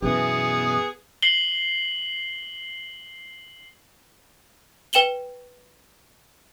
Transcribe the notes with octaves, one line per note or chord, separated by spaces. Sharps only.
F#2 B2 E3 B3 G#4
C7 F#7 G7
B4 G5 E7 F#7 G7